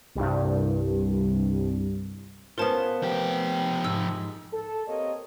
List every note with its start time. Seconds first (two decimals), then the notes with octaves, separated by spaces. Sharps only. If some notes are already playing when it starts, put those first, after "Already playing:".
0.15 C2 G2
2.58 B3 C#4 F4 A#4 C5 A5
3.03 F3 G4
3.84 G#2 E6
4.53 A4
4.88 A#3 C4 G4 A4 C#5 D#5